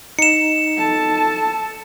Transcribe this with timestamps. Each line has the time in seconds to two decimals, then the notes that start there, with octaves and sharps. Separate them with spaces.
0.19 D#4 C#7 E7
0.78 A4 A5